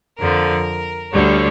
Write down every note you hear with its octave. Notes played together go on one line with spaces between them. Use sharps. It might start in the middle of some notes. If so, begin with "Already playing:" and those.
F2 D3 F3 A#4
D2 D3 G3 C#5